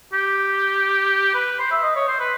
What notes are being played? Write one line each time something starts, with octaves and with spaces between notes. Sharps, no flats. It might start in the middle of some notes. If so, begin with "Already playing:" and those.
G4
B4
C5
E5
D#5
C#5
C5
B4